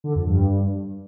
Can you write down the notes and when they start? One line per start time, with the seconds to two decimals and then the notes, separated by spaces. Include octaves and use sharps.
0.04 D3
0.15 F2
0.27 G2